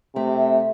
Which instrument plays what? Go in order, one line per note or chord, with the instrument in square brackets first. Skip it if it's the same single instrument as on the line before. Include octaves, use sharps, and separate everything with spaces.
[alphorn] C3 [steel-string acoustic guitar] A3